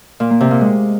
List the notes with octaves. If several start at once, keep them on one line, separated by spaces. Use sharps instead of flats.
A#2
A#3
C3
A#2
G#3